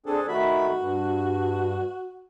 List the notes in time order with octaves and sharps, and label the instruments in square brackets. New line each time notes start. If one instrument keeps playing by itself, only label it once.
[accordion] C4 D4 G#4 [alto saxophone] A4
[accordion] D#3 A3 B5 [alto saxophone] F#4
[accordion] G2